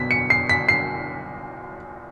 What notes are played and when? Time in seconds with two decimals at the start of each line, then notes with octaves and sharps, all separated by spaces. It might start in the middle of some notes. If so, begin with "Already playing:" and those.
Already playing: B2 B6
0.11 C#7
0.30 C7
0.49 B6
0.69 C7